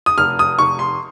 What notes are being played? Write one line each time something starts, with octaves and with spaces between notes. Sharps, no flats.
D#6
F1 F6
D#6
F1 C#6
C6